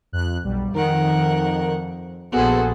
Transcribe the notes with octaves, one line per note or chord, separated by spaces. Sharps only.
F2 F#6
B1 G3
F2 D#3 A#4 F#5
A#1 B3 F#4 G#4 A4 C5